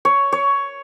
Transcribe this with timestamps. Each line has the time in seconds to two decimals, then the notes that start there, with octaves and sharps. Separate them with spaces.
0.05 C#5
0.32 C#5